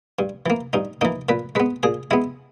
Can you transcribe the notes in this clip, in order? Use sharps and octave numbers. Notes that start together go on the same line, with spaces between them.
G2
E3 A#3
G2 D#4
E3 A#3 D#4
A#2 B4
G#3 B3 B4
A#2 G#4
G#3 B3 E4